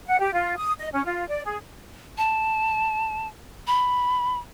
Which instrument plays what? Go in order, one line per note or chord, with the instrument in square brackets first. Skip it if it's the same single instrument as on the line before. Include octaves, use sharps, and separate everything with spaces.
[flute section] F#5
G4
F4
D#6
D#5
C#4
F4
D5
G#4
[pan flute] A5
B5